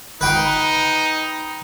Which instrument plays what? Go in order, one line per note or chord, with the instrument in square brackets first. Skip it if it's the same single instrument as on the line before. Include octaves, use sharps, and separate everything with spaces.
[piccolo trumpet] D#4 [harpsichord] B4 G5 C6